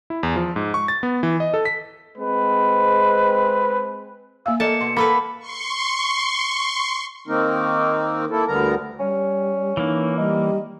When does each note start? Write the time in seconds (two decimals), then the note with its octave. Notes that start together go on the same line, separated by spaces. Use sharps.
0.10 E4
0.23 E2
0.36 F3
0.56 G#2
0.74 C#6
0.88 A6
1.03 B3
1.23 E3
1.40 D#5
1.54 A4
1.65 B6
2.18 G#3 C4 B4
4.46 A#3 E5 F5 E6
4.60 A#3 A4 D5 D#5 A5 C#7
4.81 B2 C6
4.97 A#3 A4 B4 B5
5.40 C6 C#6
7.27 D#3 A#3 C4 D#4 A#4
8.30 A#3 E4 A4
8.48 D2 D3 G3 B3 A#4 A#5
9.00 G3 C#4
9.77 E3 A#3 D#4
10.18 G3 D#4